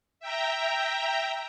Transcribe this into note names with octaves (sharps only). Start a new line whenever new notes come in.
E5 G5 A#5